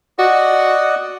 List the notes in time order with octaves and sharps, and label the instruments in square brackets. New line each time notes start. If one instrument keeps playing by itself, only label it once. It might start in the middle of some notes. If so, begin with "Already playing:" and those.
[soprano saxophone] F#4 [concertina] D5 D#5 F#5